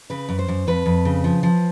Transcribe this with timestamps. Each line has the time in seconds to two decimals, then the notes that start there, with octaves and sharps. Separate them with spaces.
0.10 C#3 B4
0.29 F#2
0.39 C5
0.48 F#2
0.67 F2 B4
0.86 F2
1.05 C#3
1.24 F3
1.43 F3